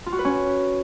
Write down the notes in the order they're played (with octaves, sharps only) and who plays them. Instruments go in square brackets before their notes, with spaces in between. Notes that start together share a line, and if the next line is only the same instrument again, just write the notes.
[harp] F4
F#4
B4
C#4